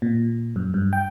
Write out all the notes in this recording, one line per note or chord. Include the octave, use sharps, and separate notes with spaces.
A#2
F#2
G2
G5